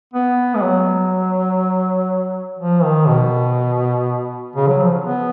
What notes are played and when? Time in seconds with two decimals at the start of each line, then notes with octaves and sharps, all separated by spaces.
0.13 B3
0.55 G#3
0.62 F#3
2.59 F3
2.83 D#3
3.07 B2
4.56 C#3
4.68 F#3
4.81 F3
5.05 B3